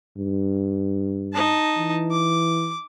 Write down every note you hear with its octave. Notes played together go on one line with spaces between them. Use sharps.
G2
D#4 A5
E3
D6